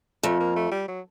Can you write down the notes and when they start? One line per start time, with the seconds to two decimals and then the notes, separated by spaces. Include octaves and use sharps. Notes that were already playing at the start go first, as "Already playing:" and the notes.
0.23 F2 A3
0.40 A#3
0.56 A3
0.71 G3
0.88 F#3